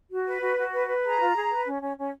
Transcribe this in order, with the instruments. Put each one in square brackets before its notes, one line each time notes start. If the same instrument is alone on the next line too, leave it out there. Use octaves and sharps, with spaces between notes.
[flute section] F#4
B4
F#4
F#4
B4
B4
G#4 A#5
F4
G#4
B4
C#4
C#4
C#4